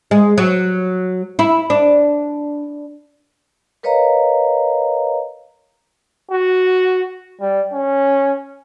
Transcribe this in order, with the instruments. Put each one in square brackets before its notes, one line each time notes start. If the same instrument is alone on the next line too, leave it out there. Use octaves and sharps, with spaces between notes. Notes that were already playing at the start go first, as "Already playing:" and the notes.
[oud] G#3
F#3
E4
D4
[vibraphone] A#4 B4 C#5 D#5 F5 A#5
[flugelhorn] F#4
G3
C#4